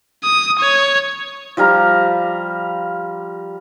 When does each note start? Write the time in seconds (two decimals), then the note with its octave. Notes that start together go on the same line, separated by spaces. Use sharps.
0.23 D#6
0.59 C#5
1.57 F3 G3 F5 A#5